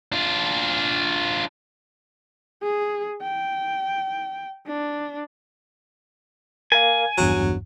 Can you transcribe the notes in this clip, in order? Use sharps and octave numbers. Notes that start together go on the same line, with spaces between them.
D4 F4
G#4
G5
D4
A#4 F5 G#5
G#1 E2 G2 F#3